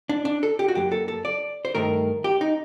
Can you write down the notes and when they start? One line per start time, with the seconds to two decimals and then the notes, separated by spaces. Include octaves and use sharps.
0.09 D4
0.25 D4
0.43 A4
0.59 G4
0.68 F#4
0.75 F#2 F#3 A#3 G4
0.92 A4
1.08 A4
1.25 D5
1.65 C5
1.75 G2 D#3 A3 A#4
2.24 G4
2.41 D#4